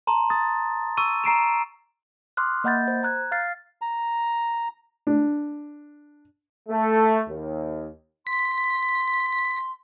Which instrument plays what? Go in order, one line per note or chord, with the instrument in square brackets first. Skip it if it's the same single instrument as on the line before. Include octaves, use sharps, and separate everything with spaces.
[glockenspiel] A5 A#5 C6
D#6 A6
C#6 E6 D#7
A#5 C7 D7 E7
[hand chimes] C6 D6 D#6 F6 F#6
A#3 D#5 F#5 B5 G6 A6
C5
A#5 F#6 G#6
F5 F6 A6 C7
[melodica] A#5
[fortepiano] D4
[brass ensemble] A3
D#2
[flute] C6 [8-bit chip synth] B6